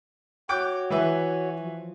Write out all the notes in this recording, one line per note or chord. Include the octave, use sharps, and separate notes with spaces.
F#4 C#5 G5 D6 F#6
E3 B4 E5
F3